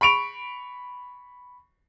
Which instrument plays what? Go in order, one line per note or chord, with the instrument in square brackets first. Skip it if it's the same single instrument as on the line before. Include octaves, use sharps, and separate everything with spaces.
[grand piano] B5 C#6 D7 F7